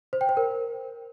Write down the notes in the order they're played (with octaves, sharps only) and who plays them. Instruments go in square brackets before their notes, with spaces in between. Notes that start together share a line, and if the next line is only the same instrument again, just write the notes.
[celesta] C5
G5
C5
A#4